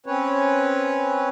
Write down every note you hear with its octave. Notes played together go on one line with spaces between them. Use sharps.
C4 C#4 B4 C#5